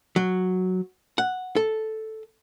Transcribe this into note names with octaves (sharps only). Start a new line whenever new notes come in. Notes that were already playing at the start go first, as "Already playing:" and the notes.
F#3
F#5
A4